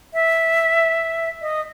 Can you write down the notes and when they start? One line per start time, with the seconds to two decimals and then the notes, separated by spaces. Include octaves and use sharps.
0.14 E5
1.42 D#5